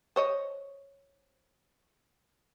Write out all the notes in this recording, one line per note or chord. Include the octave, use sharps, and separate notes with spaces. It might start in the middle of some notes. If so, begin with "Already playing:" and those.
C5 C#5 D#5